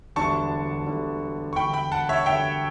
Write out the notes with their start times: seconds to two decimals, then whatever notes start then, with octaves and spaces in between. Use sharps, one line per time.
0.16 E1 D2 D3 G3 D4 A5 C#6
0.86 E1 D2 D3 G3 D4
1.53 C#6
1.56 E1 D2 D3 G3 D4 G5 B5
1.73 G5 B5
1.92 F#5 A5
2.09 C#5 E5
2.26 E1 D2 D3 G3 D4 E5 G5